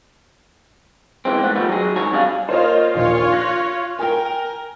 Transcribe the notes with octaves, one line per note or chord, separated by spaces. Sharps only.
E2 E3 G#3 C4
G#2 A3 F#5
D#3 F3 G3 A3 B3
F#3 G#4
D#2 G#2 D#3 F#4 C#5 G#5
G2 C3 D4 G4 G#4 F5
A#3 F4 C5 C#5 D#5
A#1 D#2 A#2 F4 C#5
F#6 A#6
A#4 G5 G#5